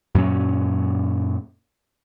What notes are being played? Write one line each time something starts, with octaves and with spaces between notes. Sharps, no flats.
F#2 A#2 F#3 C#4